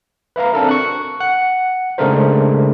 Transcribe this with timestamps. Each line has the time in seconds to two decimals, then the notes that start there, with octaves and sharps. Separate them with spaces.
0.36 B4 E5 F5 A#5
0.54 C4 D4 A4 A#4
0.69 C#6 F#6
1.20 F#5
1.98 C#3 G#3 A3 D4 A#4 C5